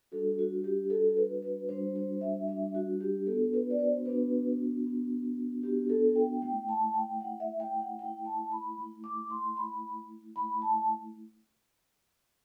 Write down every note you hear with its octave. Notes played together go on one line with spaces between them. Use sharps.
G3 D4 F#4 A4
F#4
G4
G3 D4 F#4 A4
B4
B4
G3 D4 F#4 C5
C5
E5
G3 D4 F#4 E5
F#4
G4
B3 D4 F#4 A4
B4
D5
C5
B3 D4 F#4 B4
B3 D4 F#4
B3 D4 F#4 G4
A4
G5
A3 E4 G5
A5
G5
A3 E4 F#5
E5
G5
F#5
A3 E4 G5
A5
B5
A3 E4
D6
C6
A3 E4 B5
A3 E4 B5
A5